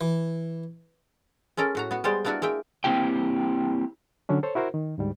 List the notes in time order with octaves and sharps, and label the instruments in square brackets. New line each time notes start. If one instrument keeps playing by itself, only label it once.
[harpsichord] E3
[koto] G#3 C#4 A4 A#4
A2 F#4 A#5
B3 F#4
G3 G#3 B3 C5 D5
A#3 B3 D4 E4 F#4 A#4
G#3 A#3 E5 G5
[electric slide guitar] A#3 C4 E4 G4 G5
[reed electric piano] D3 F#3 C#4 D4
A4 C5 C#5
E4 F#4 A#4 C5
D#3
D2 G#2 G3